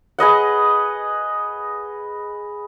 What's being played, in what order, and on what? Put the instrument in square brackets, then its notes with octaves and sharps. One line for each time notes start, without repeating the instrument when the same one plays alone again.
[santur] G#4 B4 D#5 F#5